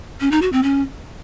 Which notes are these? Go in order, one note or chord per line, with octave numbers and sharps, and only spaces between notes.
C#4
D#4
F#4
C4
C#4